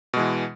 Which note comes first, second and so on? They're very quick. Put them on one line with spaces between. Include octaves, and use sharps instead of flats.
B2 G#3 E3